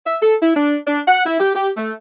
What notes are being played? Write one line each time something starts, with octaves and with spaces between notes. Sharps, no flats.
E5
A4
E4
D4
D4
F#5
E4
G4
G4
A3